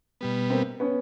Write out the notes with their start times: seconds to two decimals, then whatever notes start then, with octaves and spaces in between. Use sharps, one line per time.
0.21 B2 G3 B3
0.50 A#3 C4
0.80 B3 C#4